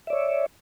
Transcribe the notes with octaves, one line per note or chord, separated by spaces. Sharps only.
C#5 D5 E5